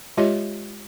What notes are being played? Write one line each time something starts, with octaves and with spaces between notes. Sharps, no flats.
G#3 F4 G4 C#5 D#5